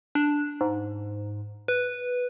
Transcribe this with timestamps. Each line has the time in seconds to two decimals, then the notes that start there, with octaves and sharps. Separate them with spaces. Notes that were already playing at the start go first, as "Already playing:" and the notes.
0.15 D4
0.61 G#2
1.68 B4